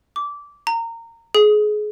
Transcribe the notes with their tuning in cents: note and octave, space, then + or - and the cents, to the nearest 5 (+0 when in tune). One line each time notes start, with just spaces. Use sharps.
D6 -20
A#5 -20
G#4 +25